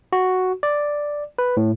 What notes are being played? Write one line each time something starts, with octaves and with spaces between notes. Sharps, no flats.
F#4
D5
B4
A2